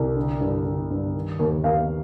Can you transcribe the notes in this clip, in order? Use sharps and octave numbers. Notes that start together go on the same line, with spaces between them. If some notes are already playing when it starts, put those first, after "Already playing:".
Already playing: C2
D3
G2
D3
G2
D#3
D#2
D#2 F5